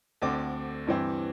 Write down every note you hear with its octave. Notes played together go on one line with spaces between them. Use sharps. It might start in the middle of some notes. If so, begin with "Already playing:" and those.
D2 D3 C4 D6
G2 E3 C4